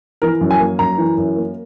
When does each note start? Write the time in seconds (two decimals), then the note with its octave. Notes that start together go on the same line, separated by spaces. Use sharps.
0.22 E3 A#4
0.41 F#2
0.51 G#5
0.60 A#3
0.79 F#2 A#5
0.98 E3
1.18 F#2
1.36 A#3